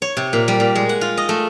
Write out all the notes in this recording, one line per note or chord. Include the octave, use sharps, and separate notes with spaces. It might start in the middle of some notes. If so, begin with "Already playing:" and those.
C#5
C3
A#2
G3
A#2
G#3
F#5
F4
D#5
A3